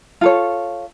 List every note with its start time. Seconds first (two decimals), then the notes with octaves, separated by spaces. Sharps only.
0.21 F4 A4 C#5